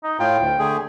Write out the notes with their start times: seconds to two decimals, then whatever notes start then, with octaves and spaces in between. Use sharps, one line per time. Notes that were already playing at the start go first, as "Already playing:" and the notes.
0.03 D#4
0.20 A2 F4 G5
0.41 D2
0.59 D3 A3 G#4